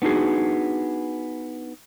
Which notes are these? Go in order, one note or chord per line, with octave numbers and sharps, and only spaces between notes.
B3 D4 D#4 F#4 G#4